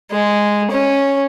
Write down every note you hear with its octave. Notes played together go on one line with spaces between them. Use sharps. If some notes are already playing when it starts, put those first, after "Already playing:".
G#3
C#4